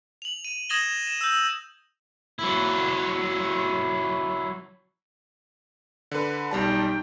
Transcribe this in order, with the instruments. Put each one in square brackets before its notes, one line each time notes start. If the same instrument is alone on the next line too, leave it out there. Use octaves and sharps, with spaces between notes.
[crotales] F7 F#7
D#7
D#6 G#6 A#6 E7 F#7 G7
E7
E6 G6
[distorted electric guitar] F#3 E4
[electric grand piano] D3 B4
[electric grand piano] B1 G3 A5 [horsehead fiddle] D#4 G5